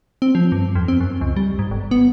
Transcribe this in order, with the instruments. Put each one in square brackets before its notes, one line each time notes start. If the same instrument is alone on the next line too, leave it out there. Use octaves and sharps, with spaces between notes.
[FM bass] C4
F3
G2
F2
C4
F#2
C#2
G3
G#2
G1
B3